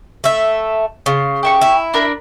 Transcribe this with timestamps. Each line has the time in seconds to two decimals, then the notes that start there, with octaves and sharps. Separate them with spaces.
0.24 A3 E5
1.06 C#3 F4
1.43 G4 E5 C#6
1.61 E4
1.94 D4 A#4 B5